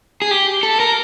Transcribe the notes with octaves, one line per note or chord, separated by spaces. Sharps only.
G#4
G4
A4
A#4